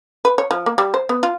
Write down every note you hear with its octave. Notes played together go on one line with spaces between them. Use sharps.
B4
C#5
F3
A#3
G3
C5
B3
F4